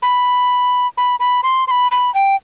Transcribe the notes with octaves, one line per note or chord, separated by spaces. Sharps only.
B5
B5
B5
C6
C6
B5
B5
G5